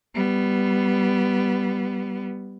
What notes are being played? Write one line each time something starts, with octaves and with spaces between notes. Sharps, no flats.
G3 B3